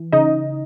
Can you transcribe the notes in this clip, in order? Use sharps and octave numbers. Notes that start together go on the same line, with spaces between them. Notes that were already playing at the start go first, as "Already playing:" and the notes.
Already playing: E3
C#3 D#4 D#5